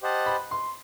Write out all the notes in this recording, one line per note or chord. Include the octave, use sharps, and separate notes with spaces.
G4 C5 D#5 F#5 A5
B5
C6